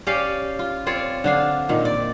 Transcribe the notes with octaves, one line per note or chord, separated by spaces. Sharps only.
C#4 G4 D5 F5
F4
C4 F4 C#5 D5
D3 D4 F5
A#2 D#3
D5